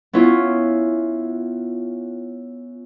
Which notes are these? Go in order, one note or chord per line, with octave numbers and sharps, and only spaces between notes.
B3 C#4 E4 F4